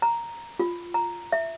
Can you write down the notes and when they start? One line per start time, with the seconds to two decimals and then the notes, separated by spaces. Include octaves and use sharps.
0.02 A#5
0.60 F4
0.94 A#5
1.32 E5